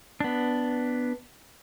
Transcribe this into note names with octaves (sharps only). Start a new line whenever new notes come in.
B3 D4